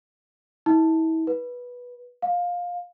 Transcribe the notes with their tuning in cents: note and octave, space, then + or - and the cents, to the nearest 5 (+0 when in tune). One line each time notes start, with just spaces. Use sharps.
E4 -40
B4 -15
F5 +20